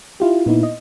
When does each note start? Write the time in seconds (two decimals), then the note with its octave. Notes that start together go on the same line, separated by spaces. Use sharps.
0.20 E4 F4 G4
0.46 A#2 B3 D#4 E4
0.63 D#5